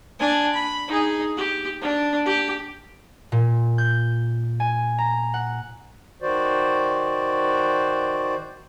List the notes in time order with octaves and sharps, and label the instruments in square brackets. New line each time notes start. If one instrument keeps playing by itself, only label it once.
[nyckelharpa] D4 G#5
B5
D#4 G#4
G4
D4
G4
[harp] A#2
G6
G#5
A#5
F#5
[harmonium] D#3 F#4 C5 D5